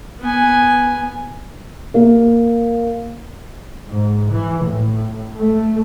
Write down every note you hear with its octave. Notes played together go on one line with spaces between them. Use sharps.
B3 G#5
A#3
G#2
E3
A2
A3